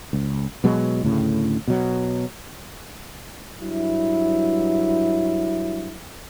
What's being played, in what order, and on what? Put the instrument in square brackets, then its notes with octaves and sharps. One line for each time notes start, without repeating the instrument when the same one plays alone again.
[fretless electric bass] C#2
B2 F#3 G#3
D2 A2 C#3
B2 F#3
[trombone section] G2 F#3 E4